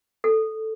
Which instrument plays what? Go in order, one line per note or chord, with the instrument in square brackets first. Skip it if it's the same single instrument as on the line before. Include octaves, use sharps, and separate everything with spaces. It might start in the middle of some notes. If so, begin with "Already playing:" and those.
[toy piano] A4